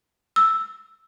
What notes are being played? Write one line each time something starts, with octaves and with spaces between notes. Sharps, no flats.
E6